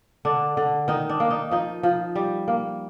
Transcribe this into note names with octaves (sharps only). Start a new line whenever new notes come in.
D3 D4
D3
D#3 D#4
D4
A#3
D#4
F3 D#4
F3
G3
A#3